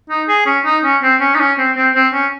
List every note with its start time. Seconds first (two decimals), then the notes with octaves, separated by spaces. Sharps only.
0.10 D#4
0.29 G#4
0.46 C#4
0.65 D#4
0.84 C#4
1.03 C4
1.20 C#4
1.35 D#4
1.40 C#4
1.58 C4
1.76 C4
1.95 C4
2.14 C#4